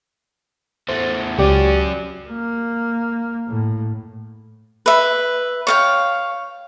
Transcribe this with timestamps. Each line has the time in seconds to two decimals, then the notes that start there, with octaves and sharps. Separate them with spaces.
0.89 E2 A3 C5
1.38 C#2 F#3 C#4 G4 D5
2.28 A#3
3.48 A2
4.86 B4 E5
5.67 C#5 F5 G5